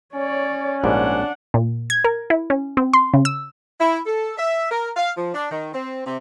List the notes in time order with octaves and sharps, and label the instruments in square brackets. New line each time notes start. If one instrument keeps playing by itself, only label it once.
[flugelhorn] C#4 [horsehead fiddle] C#5 D5
[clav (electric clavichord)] A#1 G#2 G3 [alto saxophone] D4 [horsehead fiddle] F#5
[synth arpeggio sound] A#2
G#6
A#4
E4
C#4
C4
C6
C#3
E6
[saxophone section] E4
A4
E5
A#4
F5
F3
D4
D#3
C4
C3